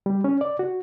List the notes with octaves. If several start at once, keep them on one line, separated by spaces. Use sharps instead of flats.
G3
C#4
D5
F#4